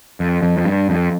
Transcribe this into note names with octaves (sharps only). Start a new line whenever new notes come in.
F2
F2
F2
G2
F2